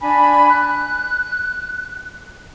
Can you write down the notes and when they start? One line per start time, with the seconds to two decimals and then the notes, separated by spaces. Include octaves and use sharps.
0.01 D4 G#5 B5
0.49 F#6